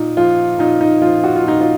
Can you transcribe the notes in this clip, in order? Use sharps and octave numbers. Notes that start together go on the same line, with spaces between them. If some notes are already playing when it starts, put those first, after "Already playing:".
Already playing: A#2 D#4
F3 F4
A#2 D#4
D#4
F3 F4
F#4
F4
A#2 D#4
F4